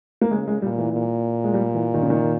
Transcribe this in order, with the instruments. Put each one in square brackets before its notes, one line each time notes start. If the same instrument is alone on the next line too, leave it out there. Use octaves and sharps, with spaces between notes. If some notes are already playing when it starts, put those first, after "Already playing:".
[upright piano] A#3
[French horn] C#3 [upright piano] G#3
[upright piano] G#3
[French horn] A#2 [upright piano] G3
[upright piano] E3
[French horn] A#2
[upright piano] G#3
G3
E3
D#3
C#3
D#3